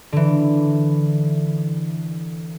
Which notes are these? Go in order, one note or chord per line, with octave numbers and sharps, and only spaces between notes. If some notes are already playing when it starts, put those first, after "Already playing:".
D3 E3